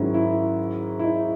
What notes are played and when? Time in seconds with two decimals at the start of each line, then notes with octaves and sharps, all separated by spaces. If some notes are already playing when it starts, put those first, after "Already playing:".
Already playing: G#2 D#3 F#3 C#4 E4
0.14 E4
0.99 E4
1.04 D#4